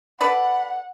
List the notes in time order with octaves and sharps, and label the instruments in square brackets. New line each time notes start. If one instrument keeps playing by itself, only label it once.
[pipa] A4 B4 D5 [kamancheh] F#5 [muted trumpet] B5